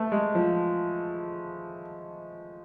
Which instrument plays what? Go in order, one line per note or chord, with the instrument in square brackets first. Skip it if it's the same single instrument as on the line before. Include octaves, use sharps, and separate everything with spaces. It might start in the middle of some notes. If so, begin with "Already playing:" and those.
Already playing: [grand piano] A3 B3
G#3
F3